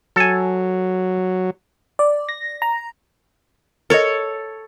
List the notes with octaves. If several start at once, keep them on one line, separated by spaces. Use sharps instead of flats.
F#3 A4 G#5
D5
A#6
A#5
A4 A#4 C#5 D#5